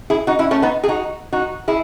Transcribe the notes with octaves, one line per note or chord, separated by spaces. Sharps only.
E4 G#4
D#4 F#4
C#4 E4
A3 C#4
B3 D#4
G#4
D#4 F#4
D#4 F#4
E4 G#4